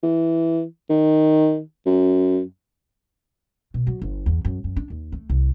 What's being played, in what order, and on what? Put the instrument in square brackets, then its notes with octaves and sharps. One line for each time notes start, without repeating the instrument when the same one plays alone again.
[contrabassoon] E3
D#3
F#2
[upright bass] B2
F#3
G1
E2
F#2
F#2
D4
D#2
A3
C2